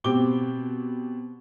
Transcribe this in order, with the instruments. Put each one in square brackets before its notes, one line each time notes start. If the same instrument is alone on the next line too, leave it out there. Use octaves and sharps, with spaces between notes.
[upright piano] B2 C4 G4 D6 G7